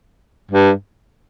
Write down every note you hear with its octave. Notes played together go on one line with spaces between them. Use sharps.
G2